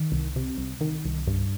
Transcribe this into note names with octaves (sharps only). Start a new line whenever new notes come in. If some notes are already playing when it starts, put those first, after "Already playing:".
Already playing: D#3
C2
C3
C2
D#3
C2
G2